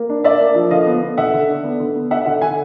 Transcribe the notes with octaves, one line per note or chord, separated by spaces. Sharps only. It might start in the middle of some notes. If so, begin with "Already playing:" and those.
Already playing: A#3
D4
D4 D5 E5
A#3
F3
D3 D#5 F5
B3
B3
D3 E5 F#5
D3
D4
B3
D3
B3
D4 E5 F#5
D3 E5 F#5
D3 F#5 G#5